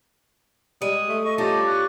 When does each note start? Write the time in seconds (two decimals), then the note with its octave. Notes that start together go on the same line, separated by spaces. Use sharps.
0.82 G3 G#3 D#6
1.09 A3
1.23 D#5 C#6
1.38 G3 C#4 D#4 F4 D5 A5
1.66 C#6 F#6